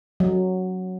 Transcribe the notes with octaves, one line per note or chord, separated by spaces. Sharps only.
F#3